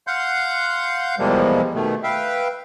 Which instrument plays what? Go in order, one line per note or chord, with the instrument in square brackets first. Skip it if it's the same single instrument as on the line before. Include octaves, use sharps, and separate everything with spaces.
[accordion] F5 F#5 C6 G6
E2 C3 F3 G3 G#3 A#3
B2 D#3 A3
B4 E5 F5 G5